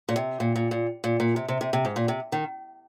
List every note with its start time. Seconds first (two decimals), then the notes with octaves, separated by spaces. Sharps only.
0.09 A#2
0.16 C3
0.40 A#2
0.56 A#2
0.71 A#2
1.04 A#2
1.20 A#2
1.36 C3
1.48 C3
1.61 C3
1.73 C3
1.85 G#2
1.96 A#2
2.08 C3
2.32 D#3